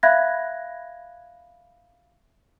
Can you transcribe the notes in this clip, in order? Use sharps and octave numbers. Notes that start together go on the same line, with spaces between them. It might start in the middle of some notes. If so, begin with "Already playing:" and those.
E5 F5 B5 F#6 G#6 A#6